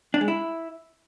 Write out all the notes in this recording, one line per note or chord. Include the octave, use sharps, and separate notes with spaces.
D4
G#3
E4